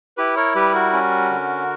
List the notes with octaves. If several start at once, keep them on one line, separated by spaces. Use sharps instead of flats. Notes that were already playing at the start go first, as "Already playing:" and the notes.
E4 G4 B4
A#4 C#5
G3 G4 B4
F#4 A#4
C#4
D3